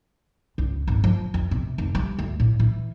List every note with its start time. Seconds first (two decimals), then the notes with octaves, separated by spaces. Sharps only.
0.58 C#2
0.88 G#1
1.04 F3
1.34 F2
1.51 C3
1.78 F1
1.95 G3
2.19 D2
2.40 A2
2.60 E3